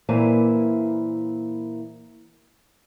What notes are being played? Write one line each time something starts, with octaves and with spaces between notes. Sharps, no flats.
A#2 E3 A#3 E4 C5 G#5